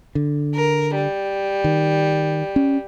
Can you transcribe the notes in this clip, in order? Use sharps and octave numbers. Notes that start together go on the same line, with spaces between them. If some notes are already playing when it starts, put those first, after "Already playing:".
D3
A#4
G3
D#3
C#4